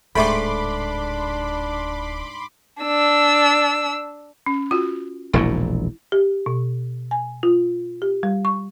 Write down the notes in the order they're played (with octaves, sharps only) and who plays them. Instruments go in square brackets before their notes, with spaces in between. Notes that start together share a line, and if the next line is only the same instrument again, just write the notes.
[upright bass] D1 [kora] G#2 A3 G5 [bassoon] D4 [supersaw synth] B5 C6 D6
[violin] D4 E6
[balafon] C#4
F4 F#4
[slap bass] E1 A#1 A#2 [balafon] E4
[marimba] G4
B2
G#5
F4
G4
G3
C#6